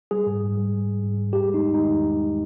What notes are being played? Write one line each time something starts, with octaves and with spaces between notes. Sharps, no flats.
G3 G#4
G#2
G#2
G3
G3
G#2
G#2
G3
E2 G4
G#3
D#4
E2
D#3 D#4
E2
G#3